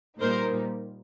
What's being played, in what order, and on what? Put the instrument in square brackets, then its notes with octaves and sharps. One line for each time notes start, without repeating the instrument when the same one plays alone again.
[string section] A#2 G3 A#3 D#4 [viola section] A#4 C5